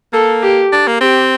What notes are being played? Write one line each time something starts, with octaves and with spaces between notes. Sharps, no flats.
A#3 A4
G4
D4
A#3
C4 G4